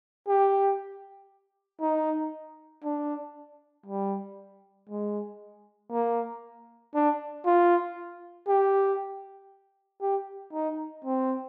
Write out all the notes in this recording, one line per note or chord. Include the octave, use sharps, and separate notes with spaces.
G4
D#4
D4
G3
G#3
A#3
D4
F4
G4
G4
D#4
C4